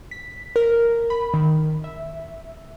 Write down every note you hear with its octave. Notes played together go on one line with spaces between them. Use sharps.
B6
A#4
B5
D#3
E5